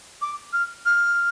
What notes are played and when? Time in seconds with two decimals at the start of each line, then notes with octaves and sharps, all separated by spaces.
0.21 D6
0.52 F6
0.85 F6